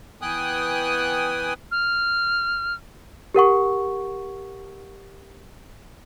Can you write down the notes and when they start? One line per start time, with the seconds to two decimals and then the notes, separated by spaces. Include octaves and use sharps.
0.22 E3 B3 G5 G#5 D#6 F#6
1.71 F6
3.34 G4 A#4 F#5 C#6